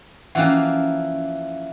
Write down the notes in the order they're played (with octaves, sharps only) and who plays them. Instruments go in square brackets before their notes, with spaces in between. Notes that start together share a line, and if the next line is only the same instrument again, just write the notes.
[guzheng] E3 F3 A#3 [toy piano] C#4 F#5